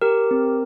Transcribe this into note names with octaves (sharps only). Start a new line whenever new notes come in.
G4 A#4
C4